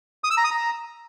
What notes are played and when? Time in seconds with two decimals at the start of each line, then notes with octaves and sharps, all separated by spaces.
0.24 D#6
0.31 E6
0.37 A#5
0.44 D#6
0.51 A#5